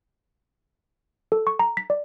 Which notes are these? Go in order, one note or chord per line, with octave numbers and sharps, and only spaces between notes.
A4
C#6
A#5
B6
D5